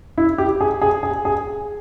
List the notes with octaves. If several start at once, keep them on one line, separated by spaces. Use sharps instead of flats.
E4
G4
G#4
G#4
G#4
G#4